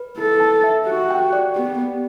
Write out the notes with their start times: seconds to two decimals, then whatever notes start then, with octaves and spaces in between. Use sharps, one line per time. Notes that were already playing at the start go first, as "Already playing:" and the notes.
Already playing: B4
0.18 E4 A4
0.40 A5
0.64 E5
0.87 F#4 G4
1.11 G5
1.33 D5
1.56 B3 G4
1.79 G4